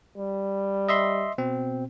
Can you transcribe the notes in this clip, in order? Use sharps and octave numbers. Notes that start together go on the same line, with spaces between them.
G3
D#5 E5 C6
B2 C4